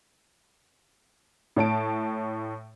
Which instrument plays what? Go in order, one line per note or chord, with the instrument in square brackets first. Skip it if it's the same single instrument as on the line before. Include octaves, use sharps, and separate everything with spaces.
[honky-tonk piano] A2 C#5 A5 D7